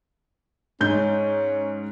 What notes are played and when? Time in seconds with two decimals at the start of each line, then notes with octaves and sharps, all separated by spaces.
0.81 G#2 C#4 G6